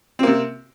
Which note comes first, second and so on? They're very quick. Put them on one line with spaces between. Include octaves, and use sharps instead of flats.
C4 A#3 C3